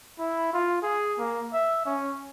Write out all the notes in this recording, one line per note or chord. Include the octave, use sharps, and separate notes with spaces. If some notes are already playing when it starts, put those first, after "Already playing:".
E4
F4
G#4
A#3
E5
C#4